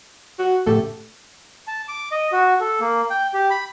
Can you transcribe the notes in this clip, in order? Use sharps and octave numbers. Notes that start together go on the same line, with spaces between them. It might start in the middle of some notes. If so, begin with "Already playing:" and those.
F#4
A2 C#3 A3 G4 A4
A5
D6
D#5
F#4
A4
A#3
G5
G4
B5